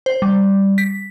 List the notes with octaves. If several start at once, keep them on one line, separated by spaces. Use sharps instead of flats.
C5
G3
B6